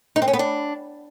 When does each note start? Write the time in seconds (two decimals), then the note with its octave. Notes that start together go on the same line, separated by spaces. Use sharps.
0.16 D#4
0.22 C4
0.28 C#4
0.33 B3
0.39 D4